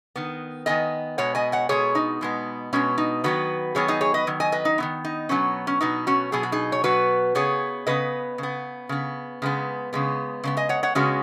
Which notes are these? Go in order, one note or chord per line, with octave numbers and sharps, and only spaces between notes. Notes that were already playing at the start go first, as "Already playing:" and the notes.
D#3 B3
D#3 B3 D#5 G#5
B2 G#3 B3 C#5 F#5
D#5 G#5
C#5 F#5
B2 G#3 B3 G#4 C#5
D#4
B2 G#3 B3
B2 G#3 B3 C#4
D#4
D#3 F#3 B3 F#4 B4
D#3 F#3 B3 G#4 C#5
D#4 G#4
G#4 C#5
B4 D#5
D#3 F#3
D#5 G#5
B4 D#5
D#4
D#3 F#3 B3
D#4
B2 F#3 B3 C#4
C#4
B2 F#3 B3 D#4
C#4 F#4
B2 F#3 B3 G#4
F#4
D#4 G#4
C#5
B2 F#3 B3 F#4 B4
C#3 B3 G#4 C#5
C#3 B3 B4 D#5
C#3 B3
C#3 B3
C#3 G#3 B3
C#3 G#3 B3
C#3 G#3 B3
D#5 G#5
C#5 F#5
C#5 F#5
C#3 G#3 B3 C#4 F#4